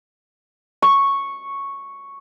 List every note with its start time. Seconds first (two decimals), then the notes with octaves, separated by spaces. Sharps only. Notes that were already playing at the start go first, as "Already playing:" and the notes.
0.82 C#6